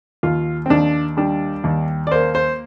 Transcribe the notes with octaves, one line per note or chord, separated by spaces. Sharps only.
D#2 F4
C4
D#2 D4
G3 D4
D#2
D5
A#3 C5
C5